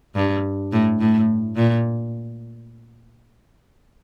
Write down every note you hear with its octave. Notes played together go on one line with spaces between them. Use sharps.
G2
A2
A2
A#2